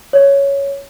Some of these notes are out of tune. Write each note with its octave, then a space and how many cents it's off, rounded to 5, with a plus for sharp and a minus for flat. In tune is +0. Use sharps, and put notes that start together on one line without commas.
C#5 +5